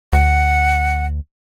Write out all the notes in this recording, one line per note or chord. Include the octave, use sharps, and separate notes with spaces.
D2 F#5